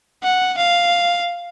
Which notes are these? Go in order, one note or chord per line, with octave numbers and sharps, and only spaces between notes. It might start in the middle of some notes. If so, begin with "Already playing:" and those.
F#5
F5